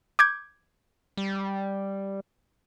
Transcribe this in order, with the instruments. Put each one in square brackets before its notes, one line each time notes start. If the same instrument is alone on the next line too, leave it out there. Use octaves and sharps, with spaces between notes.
[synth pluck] D6 G6 G#6
[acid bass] G3